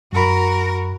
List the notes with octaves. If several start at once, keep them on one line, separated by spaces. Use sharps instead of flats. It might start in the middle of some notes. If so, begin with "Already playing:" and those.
F#2 F#4 A#4 B5